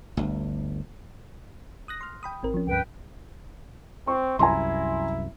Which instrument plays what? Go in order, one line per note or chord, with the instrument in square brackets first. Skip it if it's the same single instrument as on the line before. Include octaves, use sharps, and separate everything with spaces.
[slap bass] G1 D2
[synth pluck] D#6 F#6 A#6
C6 F6
G5 B5 D#6
G#1 C4 A#4
F3 C#4
[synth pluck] C#2 G2 [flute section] B4 G5
[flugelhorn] C4 [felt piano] C#6
[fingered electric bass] C2 F#2 [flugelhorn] E4 [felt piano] G#5 A#5 C6